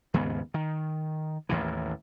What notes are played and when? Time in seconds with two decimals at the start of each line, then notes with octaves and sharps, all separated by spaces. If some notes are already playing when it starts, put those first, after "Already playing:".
0.14 D#2 G#2 C#3 B3
0.54 D#3
1.49 A1 D#2 A2 E3